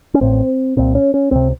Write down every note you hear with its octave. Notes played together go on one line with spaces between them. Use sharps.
C#4
A1 A2 C4
C2 A#2 C4
C#4
C#4
C#2 C3 C4